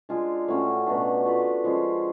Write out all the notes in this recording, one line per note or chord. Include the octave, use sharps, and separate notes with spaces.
G#3 D4 F4 G#4
A2 F#3 C#4
B2 F#3 A3 D4
A3 F4 B4
F3 G#3 C#4 F4